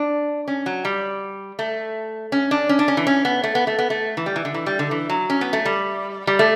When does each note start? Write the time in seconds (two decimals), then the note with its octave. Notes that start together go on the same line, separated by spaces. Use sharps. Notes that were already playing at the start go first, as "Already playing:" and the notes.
Already playing: D4
0.48 C#4
0.66 F#3
0.85 G3
1.59 A3
2.32 C#4
2.51 D4
2.69 C#4
2.79 D4
2.88 C#4
2.97 E3
3.07 C#4
3.25 B3
3.44 A3
3.55 B3
3.67 A3
3.79 B3
3.90 A3
4.17 E3
4.26 G3
4.36 E3
4.45 D3
4.54 E3
4.66 G3
4.79 D3
4.91 E3
5.10 F#3
5.30 C#4
5.41 B3
5.53 A3
5.65 G3
6.27 G3
6.39 A3